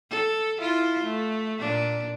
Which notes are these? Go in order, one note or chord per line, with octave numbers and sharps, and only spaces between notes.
A4
E4 F4
A3
A#2 D4